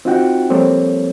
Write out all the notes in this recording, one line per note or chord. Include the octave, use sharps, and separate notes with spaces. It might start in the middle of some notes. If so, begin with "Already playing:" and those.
C4 D#4 F4 F#4 F#5 G5
F3 G3 A#3 C4 A4 C#5